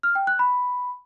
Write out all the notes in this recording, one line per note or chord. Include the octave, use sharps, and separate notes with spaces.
F6
G5
F#6
B5